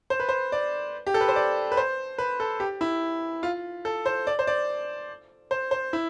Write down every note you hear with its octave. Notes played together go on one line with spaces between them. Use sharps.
C5
B4
C5
D5
G4
A4
B4
C5
D5
B4
C5
B4
A4
G4
E4
F4
A4
C5
D5
C5
D5
C5
C5
E4